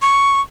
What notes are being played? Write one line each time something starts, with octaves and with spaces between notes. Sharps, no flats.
C#6